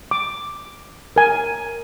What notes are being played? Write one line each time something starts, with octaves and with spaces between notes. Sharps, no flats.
D6
A#4 G#5